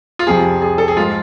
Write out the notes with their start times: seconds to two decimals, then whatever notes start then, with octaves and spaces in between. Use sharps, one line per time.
0.19 F4
0.27 F2 C3 F3 G#4
0.62 G#4
0.78 A4
0.88 G#4
0.97 G#2 F3 F4